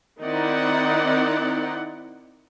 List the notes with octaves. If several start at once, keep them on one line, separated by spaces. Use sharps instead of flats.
D#3 C4 D#4 E4 D5 F#5